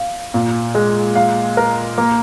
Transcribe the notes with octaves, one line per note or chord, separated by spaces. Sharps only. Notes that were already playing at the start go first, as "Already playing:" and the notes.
Already playing: F5
A#2
G#3
F5
A#4
A#3